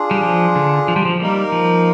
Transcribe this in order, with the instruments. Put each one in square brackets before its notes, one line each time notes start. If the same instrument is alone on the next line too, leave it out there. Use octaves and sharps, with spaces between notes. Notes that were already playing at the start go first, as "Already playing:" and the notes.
Already playing: [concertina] D4 F4 G#4
[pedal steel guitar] G3
F3
D3
F3
G3
F3
[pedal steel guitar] G3 [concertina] A#3 D#4 A#4
[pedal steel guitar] F3